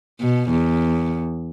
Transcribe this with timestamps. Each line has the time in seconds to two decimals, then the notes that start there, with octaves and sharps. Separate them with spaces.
0.20 B2
0.50 E2